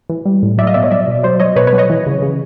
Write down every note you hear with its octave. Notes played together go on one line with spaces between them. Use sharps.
E3
G3
A2
F#3 D5 E5
D#5 F5
B2 D5 E5
C#5 D#5
F#3 D5 E5
B2
F#3 C5 D5
F#3 C#5 D#5
B2 B4 C#5
B4 C#5
F#3
C#5 D#5
E3
C#3
C#3